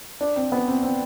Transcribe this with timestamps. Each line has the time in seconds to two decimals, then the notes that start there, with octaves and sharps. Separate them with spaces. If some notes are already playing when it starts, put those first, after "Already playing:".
0.21 D4
0.36 C4
0.52 B3
0.68 C4
0.83 C4